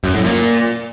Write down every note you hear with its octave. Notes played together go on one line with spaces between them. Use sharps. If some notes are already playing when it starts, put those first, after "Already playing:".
F#2
A2
A#2